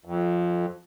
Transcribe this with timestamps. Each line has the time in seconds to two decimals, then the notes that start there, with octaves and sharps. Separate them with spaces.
0.05 F2